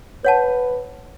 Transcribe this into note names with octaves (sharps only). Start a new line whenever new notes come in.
B4 C#5 F#5 A5